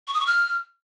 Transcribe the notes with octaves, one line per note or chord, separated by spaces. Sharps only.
C#6
D#6
C#6
F6